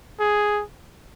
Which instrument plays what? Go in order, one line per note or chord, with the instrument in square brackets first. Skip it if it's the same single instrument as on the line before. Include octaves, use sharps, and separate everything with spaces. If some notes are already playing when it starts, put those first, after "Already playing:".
[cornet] G#4